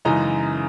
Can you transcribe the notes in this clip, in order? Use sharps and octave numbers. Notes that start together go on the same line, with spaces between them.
F#2 C#3 E3 G#3 D#4 A#5